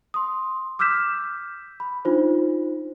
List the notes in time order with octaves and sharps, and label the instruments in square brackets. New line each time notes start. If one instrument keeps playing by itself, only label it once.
[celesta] C6 D#6
D6 E6 F6 G6 B6 E7
B5
D4 D#4 F4 C5